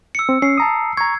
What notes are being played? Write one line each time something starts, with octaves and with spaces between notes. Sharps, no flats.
E6 C#7
C4
C#4 C7
A5 A#5 D#6
A#5 C#6 G#6